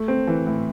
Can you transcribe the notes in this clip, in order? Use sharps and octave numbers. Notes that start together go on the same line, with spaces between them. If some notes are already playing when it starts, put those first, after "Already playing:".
Already playing: A3
C4
E3
A2